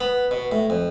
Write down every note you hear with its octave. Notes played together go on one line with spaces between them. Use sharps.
B3
B2
A2
F2